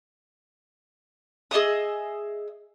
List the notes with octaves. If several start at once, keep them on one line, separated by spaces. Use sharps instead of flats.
G#4 D#5 E5 D#6